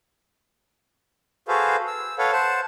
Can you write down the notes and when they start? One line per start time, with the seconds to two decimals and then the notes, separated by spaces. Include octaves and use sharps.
1.48 F#4 G#4 A4 B4 C5 F5
1.87 E6
2.18 A4 B4 C#5 F5 F#5
2.33 C5 F#5 A5